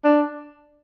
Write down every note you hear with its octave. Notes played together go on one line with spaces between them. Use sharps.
D4